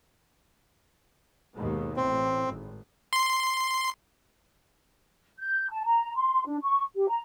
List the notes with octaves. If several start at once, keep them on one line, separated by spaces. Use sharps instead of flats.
D#2 G#2 B2
A1 A2 C4
G#1
C6
G6
A5
A#5
C6
D4
C#6
G4
A#5